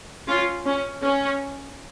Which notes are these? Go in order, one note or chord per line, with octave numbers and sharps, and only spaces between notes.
C#4 F4
C#4
C#4